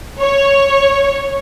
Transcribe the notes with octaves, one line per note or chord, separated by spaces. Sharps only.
C#5